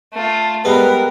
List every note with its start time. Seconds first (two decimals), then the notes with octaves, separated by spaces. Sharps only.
0.13 A3 F4
0.65 G3 G#3 B3 A#4 B4